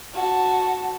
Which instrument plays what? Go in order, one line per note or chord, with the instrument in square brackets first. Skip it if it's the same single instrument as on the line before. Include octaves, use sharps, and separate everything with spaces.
[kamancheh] F#4 A5